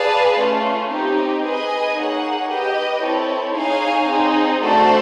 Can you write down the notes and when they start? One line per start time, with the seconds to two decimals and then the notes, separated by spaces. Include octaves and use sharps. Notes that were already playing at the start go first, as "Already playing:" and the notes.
Already playing: G#4 B4 D5 F5 A5
0.38 A3 C#4 F4
0.90 C4 D#4 G4
1.43 G#4 B4 D#5 G#5
1.96 A#3 D#4 G#4 C#5 F#5
2.49 G4 B4 D#5 G5
3.02 C4 E4 A4 C#5
3.54 D#4 G#4 C#5 F5 G#5
4.07 C4 D#4 G#4
4.60 A3 D4 F#4 A4 C5